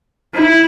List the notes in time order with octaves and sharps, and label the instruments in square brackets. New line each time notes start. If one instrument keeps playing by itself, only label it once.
[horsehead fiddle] E4